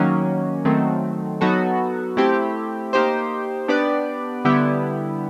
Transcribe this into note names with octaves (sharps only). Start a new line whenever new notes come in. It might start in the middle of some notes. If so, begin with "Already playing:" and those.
Already playing: D#3 F#3 A#3 C#4
D#3 F#3 A3 C4
F#3 B3 D#4 F#4 A4
A3 C4 E4 G4
A#3 D#4 G4 C5
B3 D4 G4 B4 D5
D3 G3 B3 E4 G4